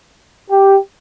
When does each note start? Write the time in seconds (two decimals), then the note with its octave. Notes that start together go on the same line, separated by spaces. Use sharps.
0.50 G4